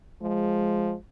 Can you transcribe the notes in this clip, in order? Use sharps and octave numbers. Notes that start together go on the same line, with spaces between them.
F3 G#3